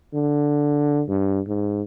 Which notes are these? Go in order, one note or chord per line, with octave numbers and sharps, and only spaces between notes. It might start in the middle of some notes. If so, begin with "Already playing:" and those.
D3
G2
G#2